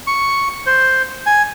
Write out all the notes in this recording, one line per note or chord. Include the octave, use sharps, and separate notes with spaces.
C#6
C5
G#5